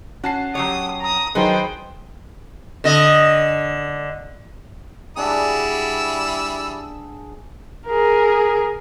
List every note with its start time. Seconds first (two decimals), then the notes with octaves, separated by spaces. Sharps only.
0.24 C#4 F#4 A5 C7
0.55 F#3 G4 C#5 D#6
1.01 A#5 D#6
1.35 D#3 F#3 D#4 G#4 B4 C5 D#5 G5
2.84 D3 D#5
5.17 G3 D4 E4 F#4 G#4 E6
7.87 G#4 A#4